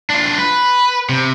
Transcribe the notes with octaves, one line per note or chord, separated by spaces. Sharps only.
D4 F4
B4
C3